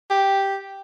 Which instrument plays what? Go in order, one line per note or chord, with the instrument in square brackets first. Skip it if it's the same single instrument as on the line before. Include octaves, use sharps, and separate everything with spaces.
[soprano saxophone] G4